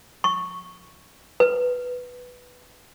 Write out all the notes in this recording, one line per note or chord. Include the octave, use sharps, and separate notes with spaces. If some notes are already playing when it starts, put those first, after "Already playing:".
C#6
B4